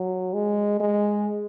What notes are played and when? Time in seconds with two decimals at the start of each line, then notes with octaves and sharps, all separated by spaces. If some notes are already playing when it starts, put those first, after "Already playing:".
Already playing: F#3
0.34 G#3
0.80 G#3